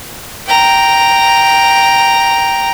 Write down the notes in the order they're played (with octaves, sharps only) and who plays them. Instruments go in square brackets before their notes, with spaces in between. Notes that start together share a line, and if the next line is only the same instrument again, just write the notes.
[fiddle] G5 A#5